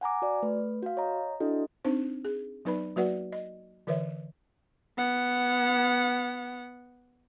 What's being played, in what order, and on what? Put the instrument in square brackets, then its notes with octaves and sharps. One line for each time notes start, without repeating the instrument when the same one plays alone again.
[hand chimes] F#5 G#5 A#5 D6
F#4 D5
A3 B4
F#4 F5
C#5 D#5 A#5
D4 E4 F#4 A4 D#5
[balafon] C4 D4 D#4 C5
G#4
F#3 B3 D#4 B4 D5 B5
F#3 A#3 F#4 B4 D5 F#5
D#5
D3 E3 A#4 B4 C#5 E5
[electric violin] B3 F#5